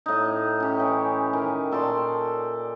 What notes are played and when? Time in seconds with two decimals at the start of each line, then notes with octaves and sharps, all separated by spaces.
0.06 A2 D#4
0.60 C#4 G4
0.80 E3 C#4
1.33 D#3
1.72 A#2 A4 D5 C6